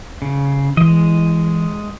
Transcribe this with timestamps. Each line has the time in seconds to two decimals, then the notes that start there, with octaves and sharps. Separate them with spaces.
0.22 C#3
0.77 E3 G#3 D#5